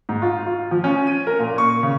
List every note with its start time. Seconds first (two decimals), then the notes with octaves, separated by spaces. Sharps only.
0.09 G#2
0.22 F4
0.46 F4
0.71 F3
0.84 C#4
1.07 D#7
1.27 A#4
1.39 A#2
1.58 C#6
1.83 C#3